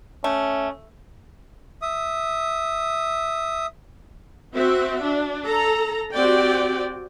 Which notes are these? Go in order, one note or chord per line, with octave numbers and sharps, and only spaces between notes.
A3 C#4
E5 D#6
C4 F#4 E5
D4
A4 A#5
C4 F#4 G4 D5 G5